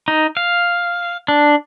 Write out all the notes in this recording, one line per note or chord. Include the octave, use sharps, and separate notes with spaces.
D#4
F5
D4